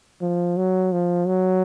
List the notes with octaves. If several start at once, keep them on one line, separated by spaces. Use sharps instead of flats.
F3
F#3
F3
F#3